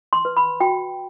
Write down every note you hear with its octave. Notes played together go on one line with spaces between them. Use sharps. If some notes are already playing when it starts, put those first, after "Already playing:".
C6
B4
B5
F#4 G5